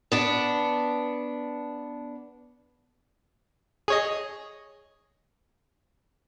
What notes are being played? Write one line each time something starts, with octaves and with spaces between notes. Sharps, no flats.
B3 D4
G#4 C#5 D#5